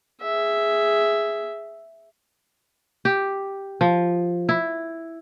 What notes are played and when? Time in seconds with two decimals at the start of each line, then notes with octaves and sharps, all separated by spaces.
0.22 G#4 E5
3.05 G4
3.81 F3
4.49 E4